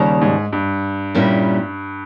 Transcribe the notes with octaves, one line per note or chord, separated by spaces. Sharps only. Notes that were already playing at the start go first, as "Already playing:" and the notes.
Already playing: D#2 C#3 G3
G#2
G2
A#2 G3 A#3 C#4 E4